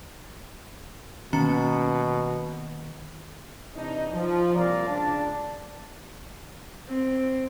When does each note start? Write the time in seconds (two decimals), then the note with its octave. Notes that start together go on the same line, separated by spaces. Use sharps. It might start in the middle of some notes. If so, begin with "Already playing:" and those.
1.33 B2 D#3 A#3 C#4 A#5 C#7
3.75 C3 E3 D4 D#4
4.13 F3
4.55 C2 A#2 F4 D5 F5 A#5
4.88 C#2 D4 A5
6.88 C4